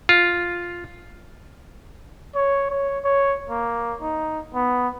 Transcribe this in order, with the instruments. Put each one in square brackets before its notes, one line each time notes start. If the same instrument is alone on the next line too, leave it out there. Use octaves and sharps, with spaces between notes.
[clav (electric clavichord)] F4
[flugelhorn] C#5
C#5
C#5
A#3
D#4
B3